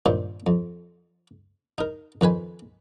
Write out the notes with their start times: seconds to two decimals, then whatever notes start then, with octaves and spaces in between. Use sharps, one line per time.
0.06 G2 A#2 D#3 C5
0.47 F2
1.78 D#4 A#4
2.21 F2 D#3 B4 G#5